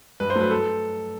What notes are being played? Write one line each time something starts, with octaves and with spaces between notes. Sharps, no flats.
G2 B4
C5
F#3 A3 B4
A4